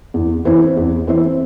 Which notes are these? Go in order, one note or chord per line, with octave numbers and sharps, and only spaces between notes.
E2
E3 C4 E4 C5
E2
E3 C4 E4 C5